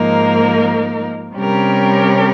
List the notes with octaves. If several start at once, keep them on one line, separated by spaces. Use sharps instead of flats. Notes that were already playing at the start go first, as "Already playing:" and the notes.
Already playing: G#2 F3 A#3 D#4 A#4
C3 G3 C#4 G4 A#4